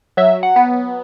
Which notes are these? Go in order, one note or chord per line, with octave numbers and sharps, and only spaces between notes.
F#3 E5
F#5
B3